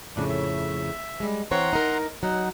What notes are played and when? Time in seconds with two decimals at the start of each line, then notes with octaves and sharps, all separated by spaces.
0.16 F2 A2 C#3 D4
0.29 E5
1.20 G3 G#3
1.51 E3 C4 C#5 F#5 A#5 C6
1.73 D#4 A#4
2.23 F#3 D#4 F#5